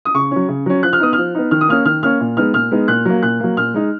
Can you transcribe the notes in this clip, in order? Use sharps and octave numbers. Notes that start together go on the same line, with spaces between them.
D#6
C#3 C#6
F#3 C#4
C#3
F#3 C#4
F3 F#6
F6
B3 D#4 D#6
F3 F6
B3 D#4
D#3 F6
D#6
A#3 C#4 F6
D#3 F6
A#3 C#4 F6
A#2
G#3 B3 D#4 F6
A#2 F6
G#3 B3 D#4
A#2 F#6
F#3 A#3
A#2 F#6
F#3 A#3
A#2 F6
G#3 D#4